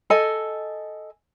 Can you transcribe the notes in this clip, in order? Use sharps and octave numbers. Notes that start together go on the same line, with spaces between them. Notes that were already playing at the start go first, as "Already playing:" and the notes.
A4 D#5 G#5